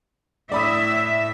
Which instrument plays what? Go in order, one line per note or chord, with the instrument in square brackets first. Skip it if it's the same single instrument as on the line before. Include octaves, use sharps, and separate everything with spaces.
[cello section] A2 E5 [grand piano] D5 B5 D#6